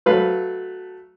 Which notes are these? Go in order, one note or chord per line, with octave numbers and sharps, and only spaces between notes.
F#3 A3 B4 F5